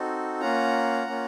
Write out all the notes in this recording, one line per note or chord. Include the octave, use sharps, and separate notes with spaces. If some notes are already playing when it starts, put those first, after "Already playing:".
Already playing: C4 D#4 F#4 A4
A#3 C#4 F4 F#5 A#5
A#3 C#4 F4